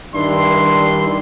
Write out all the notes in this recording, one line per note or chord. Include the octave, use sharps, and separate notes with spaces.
G2 D#3 D4 E4 C6